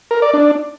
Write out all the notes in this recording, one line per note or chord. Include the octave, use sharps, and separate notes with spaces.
A#4
D5
D4